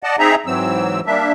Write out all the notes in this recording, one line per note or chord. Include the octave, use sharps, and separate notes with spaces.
D5 D#5 F#5 A5
C4 D#4 G#4 E5 A#5
G#2 E3 F#3 C4 E6
G3 A#3 D4 E5